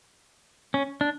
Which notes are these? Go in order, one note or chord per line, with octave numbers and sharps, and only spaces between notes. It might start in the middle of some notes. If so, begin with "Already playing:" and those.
C#4
D4